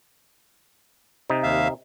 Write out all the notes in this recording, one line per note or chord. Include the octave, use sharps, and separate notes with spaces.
C3 D#4
D#2 E5 F5